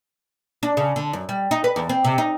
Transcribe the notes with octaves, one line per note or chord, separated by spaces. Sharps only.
D4
C#3
D3
F#2
G3
D#4
B4
E2
C4
C3
D#4